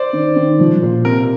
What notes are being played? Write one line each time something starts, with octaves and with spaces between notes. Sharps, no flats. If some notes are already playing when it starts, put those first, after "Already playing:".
Already playing: C5 D5
D#3
D#3
F3
A#2
C3 A#4